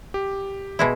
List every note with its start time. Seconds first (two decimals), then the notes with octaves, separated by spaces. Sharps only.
0.14 G4
0.79 B2 G#3 E4